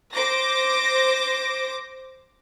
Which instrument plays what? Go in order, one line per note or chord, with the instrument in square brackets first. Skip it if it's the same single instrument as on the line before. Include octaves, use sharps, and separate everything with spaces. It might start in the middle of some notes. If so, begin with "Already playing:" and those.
[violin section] C5 D6 A#6